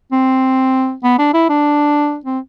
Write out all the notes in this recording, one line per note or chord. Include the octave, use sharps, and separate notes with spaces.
C4
B3
D4
E4
D4
C4